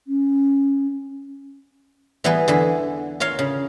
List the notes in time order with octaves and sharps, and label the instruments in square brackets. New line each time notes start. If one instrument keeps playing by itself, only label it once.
[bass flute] C#4
[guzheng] E3 G3 B3 G#4 B4
E2 D3 G#4 B5
F4 A#4 C#5 F5
C#3